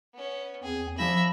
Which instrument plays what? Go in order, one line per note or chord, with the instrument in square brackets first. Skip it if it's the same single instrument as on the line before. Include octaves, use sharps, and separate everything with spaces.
[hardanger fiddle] B3 C#4
[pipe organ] E2 C4 [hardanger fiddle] G#4
[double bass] F3 [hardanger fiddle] D4 E5 [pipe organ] B5 A#6